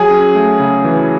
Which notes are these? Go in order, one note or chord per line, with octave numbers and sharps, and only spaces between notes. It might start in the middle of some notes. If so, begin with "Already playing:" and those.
Already playing: F#3 G#4 G#5
C#4
A3
C#3
E3